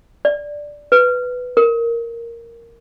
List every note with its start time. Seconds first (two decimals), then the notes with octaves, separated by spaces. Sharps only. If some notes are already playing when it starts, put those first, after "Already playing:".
0.25 D5
0.92 B4
1.57 A#4